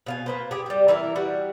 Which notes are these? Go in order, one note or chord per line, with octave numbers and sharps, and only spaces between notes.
B2 F5 G#5
A#3 B4 C5
G4 G#4
G3 G4
E3 E4 A#4
G3 F#4